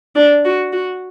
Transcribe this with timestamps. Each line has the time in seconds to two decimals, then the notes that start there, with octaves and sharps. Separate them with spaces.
0.15 D4
0.45 F#4
0.72 F#4